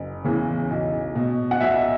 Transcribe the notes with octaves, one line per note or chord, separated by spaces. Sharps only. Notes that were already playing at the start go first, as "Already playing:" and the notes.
Already playing: F#1
E2 C#3 E3
B1
B2
F#5
B1 E5